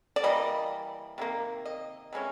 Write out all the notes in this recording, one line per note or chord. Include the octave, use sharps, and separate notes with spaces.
D5
E3 G3 A#3 D#5
C3 D#3 A#3
D#5
C3 E3 G#3 C#4